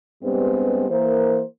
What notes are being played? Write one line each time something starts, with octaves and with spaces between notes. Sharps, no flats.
G2 G3 G#3 B3 C4
E3 A#3 A#4 C5